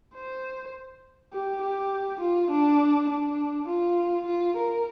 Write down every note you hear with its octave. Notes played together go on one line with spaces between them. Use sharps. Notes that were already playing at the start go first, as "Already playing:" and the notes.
C5
G4
G4
F4
D4
D4
F4
F4
A#4